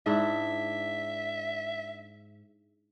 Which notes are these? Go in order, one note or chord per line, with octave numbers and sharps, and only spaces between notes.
G#2 D4 E4 E5